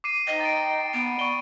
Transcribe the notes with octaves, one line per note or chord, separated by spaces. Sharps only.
D6 C7 D#7
D#4 C5 D#5 G5
A6 D7
B3 F#5 B5 D7
D5 C#6 D7 G7